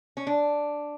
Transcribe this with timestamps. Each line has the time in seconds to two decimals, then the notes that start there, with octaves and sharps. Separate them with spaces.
0.17 C#4
0.27 D4